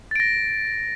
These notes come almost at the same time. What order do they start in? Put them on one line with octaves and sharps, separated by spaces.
A6 D7 A#6